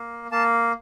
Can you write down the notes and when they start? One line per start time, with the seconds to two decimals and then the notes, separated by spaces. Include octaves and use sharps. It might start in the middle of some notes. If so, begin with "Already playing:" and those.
Already playing: A#3
0.31 A#3 A5